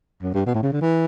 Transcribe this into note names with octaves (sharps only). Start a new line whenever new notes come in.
F#2
G2
B2
A2
C#3
D3
E3